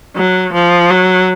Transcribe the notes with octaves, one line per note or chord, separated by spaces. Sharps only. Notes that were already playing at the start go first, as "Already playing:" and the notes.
F#3
F3
F#3